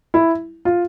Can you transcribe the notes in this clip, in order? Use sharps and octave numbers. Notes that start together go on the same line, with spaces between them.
E4
F4